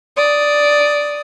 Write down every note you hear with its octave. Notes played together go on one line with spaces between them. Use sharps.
D5 D#6